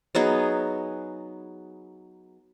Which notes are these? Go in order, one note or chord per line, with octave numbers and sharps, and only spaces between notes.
F#3 B3 D#4 G#4